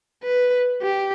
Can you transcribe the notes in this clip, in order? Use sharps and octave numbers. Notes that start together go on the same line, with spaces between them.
B4
G4